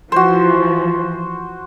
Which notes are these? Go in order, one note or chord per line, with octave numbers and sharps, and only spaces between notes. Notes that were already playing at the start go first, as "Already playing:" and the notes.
E3 F3 F#4 C5